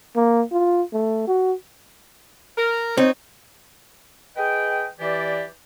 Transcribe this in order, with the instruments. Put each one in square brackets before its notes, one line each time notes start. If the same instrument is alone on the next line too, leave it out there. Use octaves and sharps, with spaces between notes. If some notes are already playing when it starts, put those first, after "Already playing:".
[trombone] A#3
F4
A3
F#4
[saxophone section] A#4
[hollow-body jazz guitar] C4 [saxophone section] D#4 C#5
[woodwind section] G#4 B4 D#5 G5
E3 G4 D5